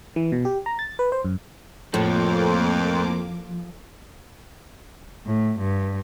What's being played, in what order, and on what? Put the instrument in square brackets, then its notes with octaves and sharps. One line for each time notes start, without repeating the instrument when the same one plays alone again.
[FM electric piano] E3
B2
G4
A#5
A6
B4
C5
F#2
[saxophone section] F2 [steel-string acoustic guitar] A2 [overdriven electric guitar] F3 [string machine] A#3 D6
[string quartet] A2
G2